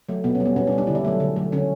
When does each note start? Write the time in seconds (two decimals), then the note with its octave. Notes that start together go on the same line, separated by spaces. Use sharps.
0.09 F#3 A3
0.24 B2 B3
0.35 C#4
0.40 G3
0.45 B3
0.56 B2 C#4
0.67 D4
0.72 G3
0.78 D4
0.87 D3 E4
0.95 D4
1.05 F#3 A3
1.20 D3
1.36 F#3 A3
1.52 D3 C#4